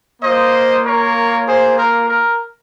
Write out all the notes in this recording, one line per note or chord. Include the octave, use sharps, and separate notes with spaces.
A#3 F4 C5 D#5
A#4 C#5
G#4 C5
A#4
A#4